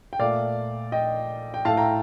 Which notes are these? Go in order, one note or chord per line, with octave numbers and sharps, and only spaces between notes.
G5
A#2 A3 D5 F5
D#5 G5
G5
A2 A3 F5 A5
G5 A#5